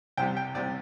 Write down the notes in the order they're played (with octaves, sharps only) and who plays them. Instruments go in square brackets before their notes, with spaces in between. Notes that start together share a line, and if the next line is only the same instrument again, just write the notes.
[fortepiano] C2 C3 G3 G5
G5
C2 C3 G3 D5